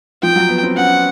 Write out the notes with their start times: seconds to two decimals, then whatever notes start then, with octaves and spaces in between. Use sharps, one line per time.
0.22 F3 G5
0.36 F#3
0.49 B3
0.63 C4
0.77 C#4 F#5